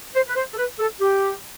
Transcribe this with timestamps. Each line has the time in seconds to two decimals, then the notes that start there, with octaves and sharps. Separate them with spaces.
0.15 C5
0.28 B4
0.36 C5
0.53 A4
0.58 B4
0.79 A4
1.01 G4